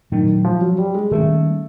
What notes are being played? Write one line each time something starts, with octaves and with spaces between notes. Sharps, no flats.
A#2 D#3 F#3 A3
F3
F#3
G3
G#3
D#3 G3 A3 A#3 C#4